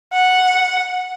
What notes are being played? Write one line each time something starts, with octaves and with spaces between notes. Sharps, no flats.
F#5